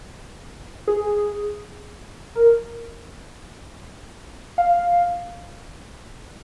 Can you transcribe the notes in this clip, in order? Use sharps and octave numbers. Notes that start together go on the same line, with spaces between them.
G#4
A#4
F5